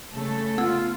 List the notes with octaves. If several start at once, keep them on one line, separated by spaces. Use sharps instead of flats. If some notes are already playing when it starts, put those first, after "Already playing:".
C#3 A3 A4
B3 F4 E6